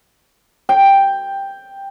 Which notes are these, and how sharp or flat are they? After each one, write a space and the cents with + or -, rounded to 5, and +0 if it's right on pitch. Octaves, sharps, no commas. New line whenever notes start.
G5 +5